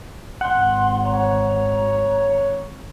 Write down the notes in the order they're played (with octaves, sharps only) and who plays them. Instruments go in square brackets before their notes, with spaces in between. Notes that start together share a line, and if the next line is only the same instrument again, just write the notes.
[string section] G#1 [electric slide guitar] F#5 [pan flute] C6
[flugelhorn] C#5 [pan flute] A#5